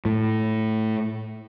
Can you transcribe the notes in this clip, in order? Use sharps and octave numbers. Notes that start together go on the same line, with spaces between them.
A2